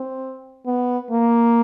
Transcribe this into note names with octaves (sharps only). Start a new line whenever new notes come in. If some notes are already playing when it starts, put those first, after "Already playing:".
Already playing: C4
B3
A#3